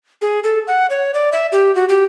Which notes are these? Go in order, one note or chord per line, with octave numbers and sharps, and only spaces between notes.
G#4
A4
F#5
C#5
D5
E5
G4
F#4
G4